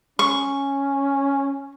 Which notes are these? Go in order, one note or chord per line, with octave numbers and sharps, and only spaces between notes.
C#4 C#6